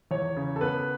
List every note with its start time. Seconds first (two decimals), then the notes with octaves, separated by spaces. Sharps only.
0.11 E2 C#5
0.37 C#3
0.56 A4
0.61 B3 B4